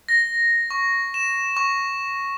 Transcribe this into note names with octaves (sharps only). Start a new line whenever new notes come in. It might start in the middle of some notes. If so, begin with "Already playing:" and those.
A#6
C#6
E7
C#6